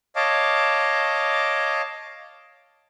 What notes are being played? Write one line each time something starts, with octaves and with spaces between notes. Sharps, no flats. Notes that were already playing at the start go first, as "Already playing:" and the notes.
C#5 D#5 F5 A5 D6